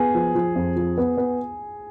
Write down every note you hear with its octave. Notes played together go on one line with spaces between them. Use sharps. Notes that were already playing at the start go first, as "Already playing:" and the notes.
Already playing: B3 G#4
F3
F3
F2
F3
B3
B3